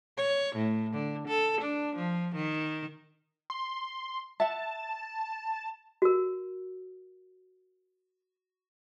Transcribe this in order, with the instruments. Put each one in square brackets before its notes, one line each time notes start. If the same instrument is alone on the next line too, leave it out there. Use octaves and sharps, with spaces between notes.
[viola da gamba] C#5
A2
D3
A4
D4
F3
D#3
[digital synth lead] C6
[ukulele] E5 F#5 [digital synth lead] A5
[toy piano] F#4 A#4